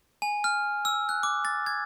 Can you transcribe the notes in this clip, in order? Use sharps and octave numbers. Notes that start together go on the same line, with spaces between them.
G#5
F6
E6
F#6
D6
A6
G#6